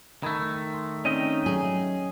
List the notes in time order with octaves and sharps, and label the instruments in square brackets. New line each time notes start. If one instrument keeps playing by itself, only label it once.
[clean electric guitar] D#3 A3 [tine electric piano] B5 G#6
[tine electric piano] C6
[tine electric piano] C4 D#4 D5 [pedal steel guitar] C#4 D#5 G5
[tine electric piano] F#3 [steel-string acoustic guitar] G#4